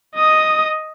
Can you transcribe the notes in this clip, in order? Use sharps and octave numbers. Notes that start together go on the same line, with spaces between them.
D#5 D#6